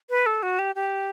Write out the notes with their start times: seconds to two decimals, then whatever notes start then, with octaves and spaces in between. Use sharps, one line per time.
0.10 B4
0.26 A4
0.43 F#4
0.59 G4
0.75 G4